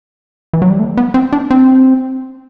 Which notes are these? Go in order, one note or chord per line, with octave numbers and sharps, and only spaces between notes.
E3
F#3
G3
A3
B3
C4
D4
C4